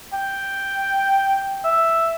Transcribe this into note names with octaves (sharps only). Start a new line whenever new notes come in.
G5
E5